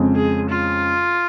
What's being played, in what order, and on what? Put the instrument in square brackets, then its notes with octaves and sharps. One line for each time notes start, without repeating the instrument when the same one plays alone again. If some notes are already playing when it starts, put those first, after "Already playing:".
Already playing: [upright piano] F2 C#3 G#3 C4
[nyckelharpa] G#4
F4